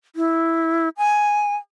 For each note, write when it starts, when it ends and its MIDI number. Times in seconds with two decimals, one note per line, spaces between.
0.16 0.89 64
0.97 1.56 80